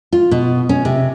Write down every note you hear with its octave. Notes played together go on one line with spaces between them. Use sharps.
F4
B2
C#4
C3